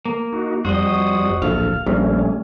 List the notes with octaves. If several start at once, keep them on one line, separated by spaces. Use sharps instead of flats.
A#3
D#4 F#4
F2 G3 F#4 C5 D#5 D#6
D1 A#1 A4 F5
A#1 G3 A3 C#4